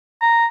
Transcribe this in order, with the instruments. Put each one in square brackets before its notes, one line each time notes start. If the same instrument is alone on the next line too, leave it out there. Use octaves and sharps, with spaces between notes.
[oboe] A#5